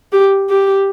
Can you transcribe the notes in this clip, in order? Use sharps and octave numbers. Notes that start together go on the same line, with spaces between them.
G4
G4